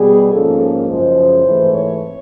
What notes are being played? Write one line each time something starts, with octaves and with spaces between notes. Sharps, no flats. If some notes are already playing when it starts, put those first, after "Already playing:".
Already playing: B2 G3 B3 G#4
G#2 F3 A#3 C#4 A4
A#4
F#2 C#3 F3 G#3 C5
G#2 E3 A3 C4
C#5